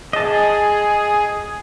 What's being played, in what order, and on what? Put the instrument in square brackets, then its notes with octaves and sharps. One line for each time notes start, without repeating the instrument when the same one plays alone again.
[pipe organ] G#4 [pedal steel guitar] D#5 A5